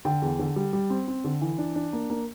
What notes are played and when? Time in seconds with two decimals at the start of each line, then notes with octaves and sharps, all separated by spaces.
0.05 D3 G5
0.22 E2
0.39 D3
0.56 G3
0.73 G3
0.90 C4
1.08 C4
1.24 D3
1.42 E3
1.58 D4
1.76 D4
1.93 A#3
2.10 A#3